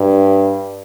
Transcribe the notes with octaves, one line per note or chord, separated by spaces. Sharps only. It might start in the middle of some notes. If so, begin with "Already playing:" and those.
Already playing: G2